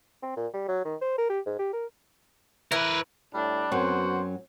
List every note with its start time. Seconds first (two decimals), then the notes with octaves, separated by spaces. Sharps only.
0.23 C4
0.37 A#2
0.54 G3
0.68 F#3
0.85 D#3
1.02 C5
1.18 A#4
1.30 G4
1.46 G#2
1.59 G4
1.73 A#4
2.72 E3 A#4 B4
3.34 A2 G3 D4
3.71 F#2 F#3 B3 C4 F#4 C5